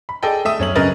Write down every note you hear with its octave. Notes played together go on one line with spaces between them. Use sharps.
B5
G#4 A4 D5 D#5 G5
A3 E5 D#6
F#2 C#4 F#7
F#2 C#3 A#4 B4 D#5 A6